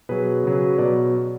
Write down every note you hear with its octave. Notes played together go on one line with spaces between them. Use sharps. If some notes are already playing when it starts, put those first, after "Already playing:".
B2 F#3 G#4 B4
C#3 F#3
B2 F#3 B4 D5